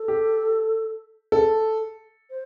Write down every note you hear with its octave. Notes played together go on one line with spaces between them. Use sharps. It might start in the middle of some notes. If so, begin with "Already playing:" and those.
Already playing: A4
G4
A4
C5